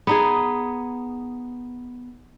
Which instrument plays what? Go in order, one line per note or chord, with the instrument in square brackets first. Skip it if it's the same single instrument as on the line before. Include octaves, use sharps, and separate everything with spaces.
[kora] B3 D#4 G#4